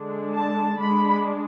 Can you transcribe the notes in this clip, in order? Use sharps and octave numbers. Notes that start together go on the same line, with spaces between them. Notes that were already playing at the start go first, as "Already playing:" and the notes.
Already playing: D3 G#3 D4
A5
G#3 D4 B5